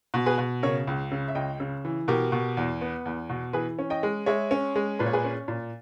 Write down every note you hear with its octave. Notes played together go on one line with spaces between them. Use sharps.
B2
G#4 B4
B2
C#3 A#4 C#5
C#2
C#3
E5
C#2 D#5 G5
C#3
E3
B2 G4 A#4
B2
E2
B3
E2
B2
E3 G#4 B4
C#4
D#5 G5
G#3
G#3 C#5 E5
C#4
G#3
A#2 B4
C#5
G#4 B4
C#4
A#2